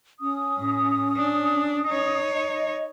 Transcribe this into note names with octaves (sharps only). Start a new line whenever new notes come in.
C#4 D#6
A2
D4
D#4 C#5
D#5